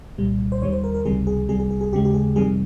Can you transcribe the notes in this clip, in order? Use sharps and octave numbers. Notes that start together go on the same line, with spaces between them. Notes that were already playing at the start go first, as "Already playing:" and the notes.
C2 A#2 G3
C5
D#2 D#3 G3 C#5
C5
A#4
A#4
C#2 C3 D#3 G3 G#4
G#4
C2 C3 G3 G#4
G#4
G#4
G#4
D#2 C#3 G#3 G4
G4
G#4
F2 C3 D#3 G3 G#4